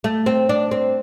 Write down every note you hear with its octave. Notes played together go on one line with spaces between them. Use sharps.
A3
C4
D4
C4